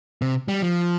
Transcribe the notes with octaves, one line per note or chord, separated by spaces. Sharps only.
C3
G3
F3